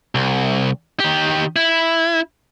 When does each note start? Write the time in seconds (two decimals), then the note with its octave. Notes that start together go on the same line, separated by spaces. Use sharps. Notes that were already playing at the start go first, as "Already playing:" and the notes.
0.15 C2
1.00 D#3 G4
1.56 E4